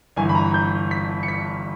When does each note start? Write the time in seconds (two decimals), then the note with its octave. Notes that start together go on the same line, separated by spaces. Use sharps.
0.16 G1 G2 E3 G#5
0.29 B5
0.35 A#5
0.54 G6
0.91 B6
1.23 C#7
1.28 B6